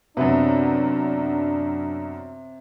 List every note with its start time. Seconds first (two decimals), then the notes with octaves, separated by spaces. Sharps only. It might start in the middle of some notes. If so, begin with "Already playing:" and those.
0.17 F#2 C3 B3 D4